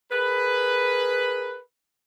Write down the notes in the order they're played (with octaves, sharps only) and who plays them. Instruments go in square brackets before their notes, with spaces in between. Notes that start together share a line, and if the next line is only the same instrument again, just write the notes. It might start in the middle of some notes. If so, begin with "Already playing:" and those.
[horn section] G#4 A#4 B4